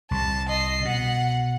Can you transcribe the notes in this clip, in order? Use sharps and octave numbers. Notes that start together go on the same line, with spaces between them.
C2 C3 A5
D#5 C7
B2 F#5